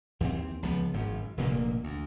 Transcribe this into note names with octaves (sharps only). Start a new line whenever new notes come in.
D#2 E3 G#3 C4
C#2 F3 B3
G#1 F#2
F1 D2 A#2 A#3
D2